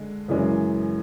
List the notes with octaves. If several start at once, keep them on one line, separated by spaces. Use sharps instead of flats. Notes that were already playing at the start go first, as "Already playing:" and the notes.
Already playing: D3 G#3
F#2 C#3 E3 G#3 C#4